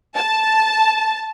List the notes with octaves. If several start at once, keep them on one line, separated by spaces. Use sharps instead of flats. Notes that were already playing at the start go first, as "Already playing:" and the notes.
A5